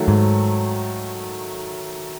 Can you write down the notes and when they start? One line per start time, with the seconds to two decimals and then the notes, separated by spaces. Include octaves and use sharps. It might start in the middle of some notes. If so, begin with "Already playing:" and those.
Already playing: D#3 F#3 A3
0.08 G#2